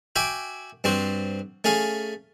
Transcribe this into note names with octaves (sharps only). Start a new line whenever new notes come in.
F#4 E5 G5 G#5 D6
G2 C4 F#4 C5
A3 C#4 G#4 F5